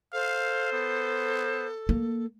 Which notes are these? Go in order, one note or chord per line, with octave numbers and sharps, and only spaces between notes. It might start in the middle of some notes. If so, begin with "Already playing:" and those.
A4 C5 F5
B3
A#3